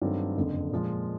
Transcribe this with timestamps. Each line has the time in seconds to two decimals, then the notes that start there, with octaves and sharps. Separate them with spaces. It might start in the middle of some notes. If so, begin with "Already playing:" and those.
0.02 G2 D#3 F#3 A3 C4
0.37 F#1 F2 D3
0.71 A#2 F3 G#3